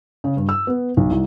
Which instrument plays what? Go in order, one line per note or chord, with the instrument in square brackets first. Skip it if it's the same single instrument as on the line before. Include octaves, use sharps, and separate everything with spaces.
[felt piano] C#3
G2
E6
B3
B1
C2